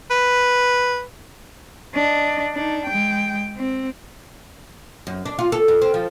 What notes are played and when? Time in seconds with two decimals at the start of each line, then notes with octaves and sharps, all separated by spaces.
0.10 B4
1.95 D4 D#5
2.54 D4 D#4
2.86 G#3 G5
3.57 C4
5.07 F#2
5.26 D4
5.39 F4
5.52 A4
5.68 F2
5.82 C4
5.94 F3